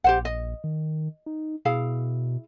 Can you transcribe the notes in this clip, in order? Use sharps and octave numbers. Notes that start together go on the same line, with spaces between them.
A#1 G4 C5 F#5
D#5
D#3
D#4
B2 E4 G#4 F5